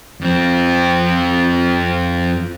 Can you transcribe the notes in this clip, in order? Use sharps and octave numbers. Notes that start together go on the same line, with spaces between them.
F2 C4